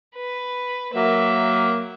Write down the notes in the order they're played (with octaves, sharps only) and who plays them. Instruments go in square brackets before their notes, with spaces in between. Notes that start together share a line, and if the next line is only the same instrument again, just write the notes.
[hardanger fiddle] B4
[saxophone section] F#3 A#3 [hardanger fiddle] E5